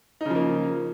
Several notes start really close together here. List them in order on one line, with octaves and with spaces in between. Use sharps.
D#4 C#3 F3 A#3